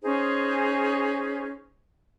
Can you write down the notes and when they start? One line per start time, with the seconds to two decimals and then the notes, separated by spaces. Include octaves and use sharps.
0.03 C#4 D#4 G#4 C5